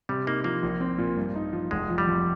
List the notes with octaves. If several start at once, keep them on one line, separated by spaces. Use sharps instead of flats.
C3 G3
A#3 D#4
F3 A#3
A#1
C4
A#2
G2
D#4
F3
F1 G#3
F3
G3
F2